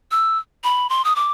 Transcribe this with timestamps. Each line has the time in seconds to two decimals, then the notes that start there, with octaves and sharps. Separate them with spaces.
0.11 E6
0.64 B5
0.89 C6
1.05 D#6
1.16 D6